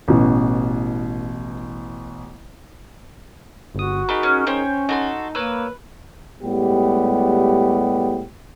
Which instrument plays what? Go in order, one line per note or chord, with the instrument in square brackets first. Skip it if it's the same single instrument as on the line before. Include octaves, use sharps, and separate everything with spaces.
[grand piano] A1 B2 E3
[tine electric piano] G1 D#6 [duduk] F#4
[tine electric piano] D#4 G#4 A#4 [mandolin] B5
[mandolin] C#4
[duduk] C#4 [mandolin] C5 C#5 G5
[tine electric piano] D#4 [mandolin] F#4 A4 C6
[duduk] A#3 [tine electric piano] A#4 C#5 E6 [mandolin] B4
[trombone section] A2 G3 G#3 B3 G4